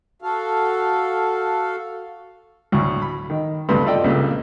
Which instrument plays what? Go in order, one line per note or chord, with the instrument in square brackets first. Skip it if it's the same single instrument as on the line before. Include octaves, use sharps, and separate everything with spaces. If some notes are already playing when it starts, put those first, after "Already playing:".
[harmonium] F#4 A4 F5
[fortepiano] D2 A2
B5
D#3
D2 G2 C3 A3 B3 C6
F4 A4 D5 D#5 G5
C#2 G2 A#2 C#3 C4